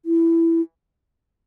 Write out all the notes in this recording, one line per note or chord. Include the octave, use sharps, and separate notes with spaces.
E4